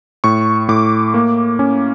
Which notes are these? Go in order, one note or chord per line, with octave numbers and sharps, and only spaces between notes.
A2 C#6
A2 D6
A#3
C#4